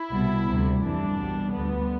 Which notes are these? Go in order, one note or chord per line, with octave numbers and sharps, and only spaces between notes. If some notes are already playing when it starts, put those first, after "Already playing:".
Already playing: E4
C2 B2 G3
D2 C3 G3
G1 F2 E3 G3 D4
C2 B2 G3
D2 D3 G3 B3